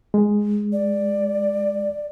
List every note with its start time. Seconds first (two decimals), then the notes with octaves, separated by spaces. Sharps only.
0.14 G#3
0.73 D5